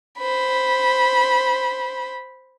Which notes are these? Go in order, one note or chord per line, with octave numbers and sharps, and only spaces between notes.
C5 B5